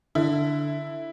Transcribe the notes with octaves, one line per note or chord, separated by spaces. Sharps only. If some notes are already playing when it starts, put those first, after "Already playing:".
D3 E4